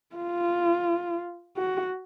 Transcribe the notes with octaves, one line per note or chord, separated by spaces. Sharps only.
F4
F#4